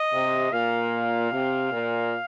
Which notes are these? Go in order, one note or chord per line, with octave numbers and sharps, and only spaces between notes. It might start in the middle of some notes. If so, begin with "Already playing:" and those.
Already playing: D#5
C3
A#2 F5
C3
A#2